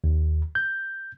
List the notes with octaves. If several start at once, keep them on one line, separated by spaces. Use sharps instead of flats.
D#2
G6